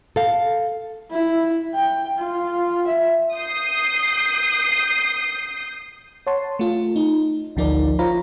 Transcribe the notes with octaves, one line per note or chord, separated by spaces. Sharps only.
A4 F5
E4
G5
F4
E5
D#6 G6 C7
C#5 F#5 A5 C6
A3 F4
D#4
A1 D2 F3 D#4 A#4 D5
F4 C5 C#5 F5 A#5 B5